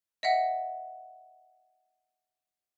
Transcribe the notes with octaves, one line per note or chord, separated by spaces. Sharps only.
D#5 E5 F#5